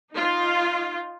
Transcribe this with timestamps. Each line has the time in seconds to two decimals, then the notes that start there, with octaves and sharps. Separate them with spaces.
0.13 D#4 F4